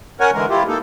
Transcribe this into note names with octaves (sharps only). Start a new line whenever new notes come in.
C#4 A#4 C#5 F#5 G#5
D3 E3 G#3 A#4
E4 F4 G4
A#3 D#4 A4